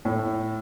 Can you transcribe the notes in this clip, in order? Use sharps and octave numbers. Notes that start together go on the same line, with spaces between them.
A2